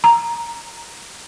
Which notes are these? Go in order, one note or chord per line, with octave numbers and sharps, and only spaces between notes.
A#5